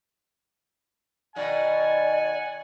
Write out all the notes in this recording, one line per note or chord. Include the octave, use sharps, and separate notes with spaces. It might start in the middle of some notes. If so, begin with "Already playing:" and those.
B2 D#3 D#4 D5 F#5 G#5